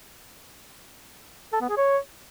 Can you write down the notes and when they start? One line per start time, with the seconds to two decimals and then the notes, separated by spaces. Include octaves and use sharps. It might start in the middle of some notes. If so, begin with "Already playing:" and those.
1.53 A4
1.61 B3
1.69 G#4
1.77 C#5